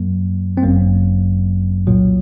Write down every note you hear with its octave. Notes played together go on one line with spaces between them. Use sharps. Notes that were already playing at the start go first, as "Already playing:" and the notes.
Already playing: F#2 F#3 A#3
C4
G1 F#2 F#3 A#3
C2 A#2 F#3